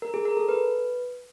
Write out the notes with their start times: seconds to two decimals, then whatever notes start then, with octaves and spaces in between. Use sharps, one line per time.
0.02 A#4
0.14 G#4
0.25 A#4
0.37 A4
0.48 B4